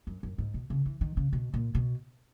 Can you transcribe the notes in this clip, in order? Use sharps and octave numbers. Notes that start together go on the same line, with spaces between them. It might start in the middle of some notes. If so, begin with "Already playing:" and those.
F#2
F#2
G#2
B2
C#3
E3
D#3
C#3
B2
A#2
B2